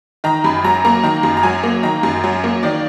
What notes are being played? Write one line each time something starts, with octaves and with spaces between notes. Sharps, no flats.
D#3 A#5
F#2 B5
F#3 A#5
A#3 A#5
D#3 A#5
F#2
A#5
F#3 G#5
A#3
D#3 A#5
F#2
F#3
A#3
D#3 D5